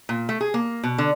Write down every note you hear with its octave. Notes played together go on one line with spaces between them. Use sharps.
A#2
A3
G#4
A#3
B2
D3